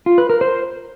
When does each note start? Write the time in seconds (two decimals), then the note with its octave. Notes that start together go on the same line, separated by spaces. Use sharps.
0.06 F4
0.18 B4
0.30 A#4
0.41 C5